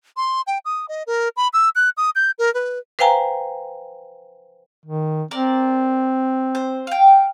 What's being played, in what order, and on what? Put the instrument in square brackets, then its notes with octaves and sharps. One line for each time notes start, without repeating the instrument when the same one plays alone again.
[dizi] C6
G5
D#6
D#5
A#4
B5
E6
F#6
D#6
G6
A#4
B4
[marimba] B4 C5 F5 G5 G#5 A#5
[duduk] D#3
[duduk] C4 [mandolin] A#4 D5
[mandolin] C5
F5 G5